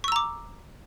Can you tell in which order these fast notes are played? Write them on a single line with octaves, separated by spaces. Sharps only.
C#6 E6 A#5 D6